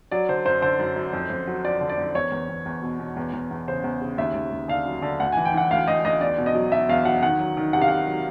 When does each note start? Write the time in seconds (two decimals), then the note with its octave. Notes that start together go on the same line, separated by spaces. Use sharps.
0.11 F#3 D5
0.29 D3 C5
0.46 F#2 C5
0.62 D3 C5
0.79 F#2
0.96 F#2
1.13 F2
1.30 F2
1.47 F#3
1.65 F2 D5
1.81 D3
1.89 D5
1.98 F2
2.15 E2 C#5
2.32 E2
2.49 E2
2.66 E2
2.82 B2
3.00 B2
3.17 E2
3.33 E2
3.51 E2
3.68 C#3 C5
3.84 E2
4.01 C#3
4.18 D#2 E5
4.35 D#2
4.52 D#2
4.68 D3 F5
4.86 F#3
5.02 D3
5.20 D2 F#5
5.32 E3 G#5
5.45 G5
5.54 E3 F#5
5.71 D2 F5
5.88 D2 D#5
6.05 D2 D#5
6.21 E2 D5
6.38 B2
6.46 D#5
6.55 F#3
6.72 B2 E5
6.89 E2 F5
7.05 F#3 F#5
7.23 D#3 F#5
7.39 F#3
7.57 D#3
7.73 C3 F#5
7.81 F5
7.88 C3 F#5
8.07 F#3